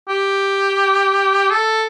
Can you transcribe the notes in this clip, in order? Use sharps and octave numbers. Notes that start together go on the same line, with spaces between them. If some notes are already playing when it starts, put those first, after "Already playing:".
G4
A4